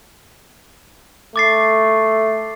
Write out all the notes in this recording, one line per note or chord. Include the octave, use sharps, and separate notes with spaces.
A3 D6 A6 C7